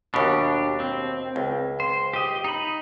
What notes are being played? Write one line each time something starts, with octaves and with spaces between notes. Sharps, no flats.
D#2 B2 D4 G4
C4
C#2
C5
G4 D#5
D#4 B5